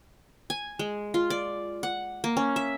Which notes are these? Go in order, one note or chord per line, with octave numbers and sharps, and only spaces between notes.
G#5
G#3
F4
D5
F#5
A#3
C#4
E5